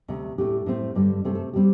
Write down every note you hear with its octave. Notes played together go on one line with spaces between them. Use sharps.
D2 C3 A3
A2 A3 D4 G4
A2 A3 C4
G2 D3 G3
C3 A3 C4 A4
A4
G3 C4 G4